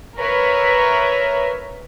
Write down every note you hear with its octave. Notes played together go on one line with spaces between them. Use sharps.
A#4 B4 C#5 E5